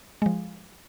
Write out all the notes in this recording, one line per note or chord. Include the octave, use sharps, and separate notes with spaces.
F3 G#3